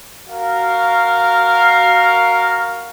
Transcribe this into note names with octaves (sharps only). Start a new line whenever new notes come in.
F#4 A#4 F5